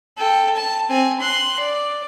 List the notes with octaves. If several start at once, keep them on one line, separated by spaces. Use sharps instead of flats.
A4 G5
A5
C4 G#5
C6 F#6
D5